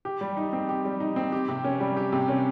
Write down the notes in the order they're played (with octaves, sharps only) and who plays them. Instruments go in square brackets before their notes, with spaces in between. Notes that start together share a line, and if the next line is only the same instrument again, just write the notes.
[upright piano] G4
G3
D#4
C4
G4
G3
D#4
C4
G4
C3
C#4
G3
G4
C3
C#4